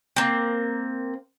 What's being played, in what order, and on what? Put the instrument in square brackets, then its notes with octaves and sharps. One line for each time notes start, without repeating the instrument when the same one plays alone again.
[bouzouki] A#3 C4